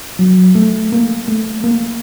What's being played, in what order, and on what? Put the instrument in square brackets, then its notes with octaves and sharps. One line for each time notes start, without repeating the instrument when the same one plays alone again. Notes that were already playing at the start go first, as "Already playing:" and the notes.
[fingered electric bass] F#3
A3
A#3
A3
A#3